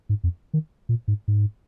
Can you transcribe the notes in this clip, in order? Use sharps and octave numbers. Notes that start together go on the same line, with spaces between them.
G#2
F2
D#3
A#2
G#2
G#2